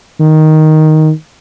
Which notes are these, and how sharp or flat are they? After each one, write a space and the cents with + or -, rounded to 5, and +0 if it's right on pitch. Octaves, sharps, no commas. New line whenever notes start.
D#3 +5